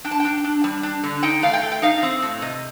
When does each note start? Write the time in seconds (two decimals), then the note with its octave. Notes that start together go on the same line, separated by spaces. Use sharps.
0.04 D4 G5
0.11 A5
0.20 D4 G5
0.44 D4
0.64 G3
0.83 D4
1.03 D3
1.23 D#4 G5
1.43 A3 F5
1.53 G5
1.63 A3
1.72 G5
1.82 D#4 F5
2.03 C4
2.22 A2
2.42 C3 D#5